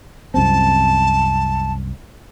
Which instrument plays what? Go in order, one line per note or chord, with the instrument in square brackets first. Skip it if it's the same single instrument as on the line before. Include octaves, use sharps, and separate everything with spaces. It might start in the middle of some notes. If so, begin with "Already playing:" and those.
[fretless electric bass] C2 F#2 C4 [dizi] A5